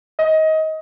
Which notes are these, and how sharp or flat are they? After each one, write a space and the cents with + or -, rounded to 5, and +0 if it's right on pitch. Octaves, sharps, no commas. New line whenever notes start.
D#5 +25